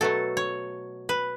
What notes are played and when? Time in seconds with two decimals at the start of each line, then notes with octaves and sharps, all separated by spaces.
0.01 B2 F#3 A3 A4
0.37 C#5
1.09 B4